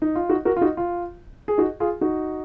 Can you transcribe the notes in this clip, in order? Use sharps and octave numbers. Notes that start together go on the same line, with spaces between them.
D#4
F4
D#4 F#4
F#4 A#4
F4
D#4 F#4
F4
G#4
D#4 F#4
F4 G#4
D#4 F#4